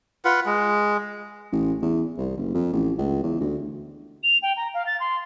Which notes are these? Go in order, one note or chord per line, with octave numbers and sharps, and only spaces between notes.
F4 B4 F#5
G#3
A1
E2
C2
F#1
F2
A1
C#2
E2
D2
F7
G5
A#5
F5
A6
C6